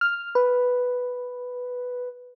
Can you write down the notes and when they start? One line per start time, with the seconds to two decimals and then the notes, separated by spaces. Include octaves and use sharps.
0.01 F6
0.35 B4